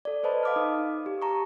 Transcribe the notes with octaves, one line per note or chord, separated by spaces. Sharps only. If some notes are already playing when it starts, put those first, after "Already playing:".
A4 D5
A4 B4 C5 D#5 A5 B5
F5 D6 F6
D#4 D#6
G4
A5 A#5 C#6